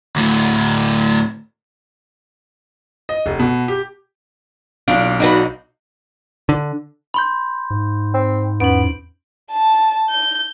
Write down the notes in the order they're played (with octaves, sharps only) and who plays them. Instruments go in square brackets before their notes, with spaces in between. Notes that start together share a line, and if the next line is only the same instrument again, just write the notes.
[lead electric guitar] D2 A2
[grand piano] D#5
F1
B2
G4
[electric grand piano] B1 F5 [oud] D4 [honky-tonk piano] F4 D7
[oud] D4 F#4 B4 [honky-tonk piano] D#4
[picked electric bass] D3
[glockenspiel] B5 C6 G6
[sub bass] G#2
[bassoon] C4
[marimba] E2 C#4 [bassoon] B3 [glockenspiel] D7 F#7
[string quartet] A5
G6